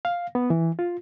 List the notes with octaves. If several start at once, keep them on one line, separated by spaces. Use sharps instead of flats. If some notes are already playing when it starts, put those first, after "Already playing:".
F5
B3
E3
F4